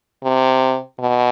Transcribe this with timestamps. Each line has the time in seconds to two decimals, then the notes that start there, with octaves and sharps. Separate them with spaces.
0.24 C3
1.00 B2